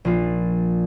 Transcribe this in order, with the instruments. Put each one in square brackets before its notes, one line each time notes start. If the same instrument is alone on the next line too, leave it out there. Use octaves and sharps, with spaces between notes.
[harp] A#1 F4